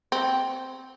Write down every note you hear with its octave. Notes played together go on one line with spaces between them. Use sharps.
C4